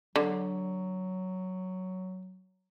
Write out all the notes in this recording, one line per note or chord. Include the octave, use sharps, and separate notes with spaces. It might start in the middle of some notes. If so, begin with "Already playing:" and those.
D3 F#3